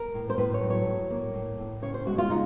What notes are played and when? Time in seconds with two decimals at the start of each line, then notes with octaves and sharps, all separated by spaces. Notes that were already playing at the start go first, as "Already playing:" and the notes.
Already playing: A#4
0.14 A2
0.30 C5
0.38 A2 B4
0.54 C#5
0.61 F#3
0.70 C#5
0.86 A2
1.10 A#3
1.34 A2
1.59 A2
1.82 C#3 C#5
1.94 C5
2.06 G#3 F#4
2.18 F4
2.30 C#3 D#4